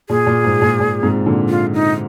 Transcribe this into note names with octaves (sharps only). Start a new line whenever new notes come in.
A#2 G#4
A#2
G#2
A#2
A#2
G#2 C3
A#2 D3
F4
D#4